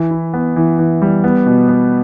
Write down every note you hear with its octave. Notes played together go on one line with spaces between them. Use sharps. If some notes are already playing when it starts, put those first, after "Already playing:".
Already playing: E3
E4
B3
E3
E3
G3
B3
B2
B3